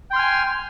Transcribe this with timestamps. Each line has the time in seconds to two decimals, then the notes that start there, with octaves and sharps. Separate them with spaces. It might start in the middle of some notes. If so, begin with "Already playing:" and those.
0.10 G5
0.13 C6
0.16 F6
0.19 G#5